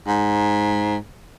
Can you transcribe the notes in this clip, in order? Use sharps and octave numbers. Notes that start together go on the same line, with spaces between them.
G#2